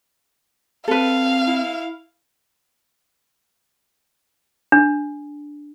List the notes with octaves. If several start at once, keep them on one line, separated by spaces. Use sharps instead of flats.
C4 A4 B4 F5
E4
D4